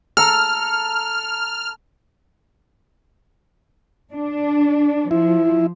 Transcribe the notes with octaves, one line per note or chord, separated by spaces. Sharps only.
A4 A#5 F6
D4
F3 E4